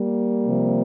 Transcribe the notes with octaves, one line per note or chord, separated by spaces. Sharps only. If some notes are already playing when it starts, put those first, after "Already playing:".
Already playing: G3 A#3
C3 F3